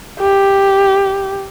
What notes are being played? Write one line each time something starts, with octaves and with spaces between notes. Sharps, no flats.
G4